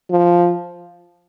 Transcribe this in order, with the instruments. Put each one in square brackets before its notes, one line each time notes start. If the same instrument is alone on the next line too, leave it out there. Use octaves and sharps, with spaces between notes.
[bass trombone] F3